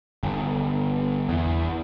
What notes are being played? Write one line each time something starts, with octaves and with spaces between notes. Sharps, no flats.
G1
E2